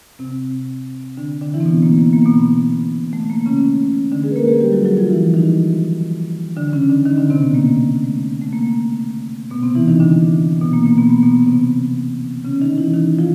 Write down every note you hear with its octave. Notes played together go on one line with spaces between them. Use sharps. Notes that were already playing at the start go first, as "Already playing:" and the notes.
C3 C4
D3 D4
D3 D4
E3 E4
C4
B2 B3
A#3
B3
A#3
B2 B3
A3
A#3
C#3 C#4
D3 D4
G#3 G#4
B4
A#3 A#4
G#3 G#4
G3 G4
F#3 F#4
F#3 F#4
F3 F4
E3 E4
D#3 D#4
D3 D4
C#3 C#4
D3 D4
D#3 D#4
D3 D4
C3 C4
B2 B3
A#3
A3
A3
A#3
B2 B3
C3 C4
E3 E4
D#3 D#4
D3 D4
B2 B3
A#3
A#3
B2 B3
A#3
B2 B3
B2 B3
C3 C4
C#3 C#4
D#3 D#4
E3 E4
D#3 D#4
F3 F4